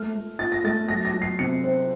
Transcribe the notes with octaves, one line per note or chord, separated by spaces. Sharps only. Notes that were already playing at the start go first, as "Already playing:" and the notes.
Already playing: A3 F6
A3
F4 A6
A#6
A3 A6
F#3 A#6
A#6
F#3
C7
C3 C#7
C4